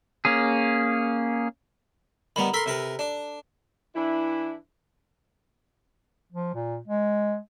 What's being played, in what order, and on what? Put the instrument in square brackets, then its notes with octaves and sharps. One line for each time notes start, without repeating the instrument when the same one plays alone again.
[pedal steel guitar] A#3 C#4 G#4
[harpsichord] D#3 G3 B3 [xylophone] A#5 B5
[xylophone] A4 E6 B6 [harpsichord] A#4 C6
[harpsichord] C3 A#4 B4
D4
[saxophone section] E3 D4 E4
[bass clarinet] F3
A#2
G#3